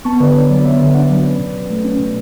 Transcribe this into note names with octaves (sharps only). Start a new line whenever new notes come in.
B3 A5 C#6
D3 B4 D5
D4 C#5
F#3 B4 D5
B3 C#5 E5
D3
D4 D5 F#5
F#3
C#4 B4 D5
B2
B2
A3
C#4
B2